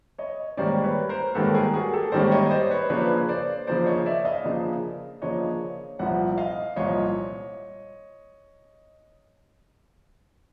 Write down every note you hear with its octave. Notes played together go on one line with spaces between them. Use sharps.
C#5 D#5
G#2 D#3 G3 A#3 C#4 C5 D5
B4 C#5
A#4 C5
G#2 D#3 G3 A#3 C#4 A4 B4
G#4 A#4
F#4 G#4
G4 A4
G#2 D#3 G3 A#3 C#4 C5 D5
C#5 D#5
D#5
C5 D5
B4 C#5
C#3 F3 A#3 D4 B4 C#5
C5 D5
C#3 F3 A#3 D4 C5 D5
C#5 D#5
D5 E5
D#5 F5
C#3 F3 A#3 D4
C#3 F3 A#3 D4 C#5 D#5
C2 A#2 F3 E5 F#5
D#5 F5
C2 A#2 F3 C#5 D#5